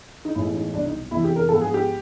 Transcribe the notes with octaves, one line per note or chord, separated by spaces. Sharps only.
D#4
A1 A2 E3 G#3 B3 E4
D#4
C2 B2 F#3 D4
D#4
F1 E2 C3 E3 E4
G4
A#4
G#2 F3 G#3 B3 A4
G#4
G4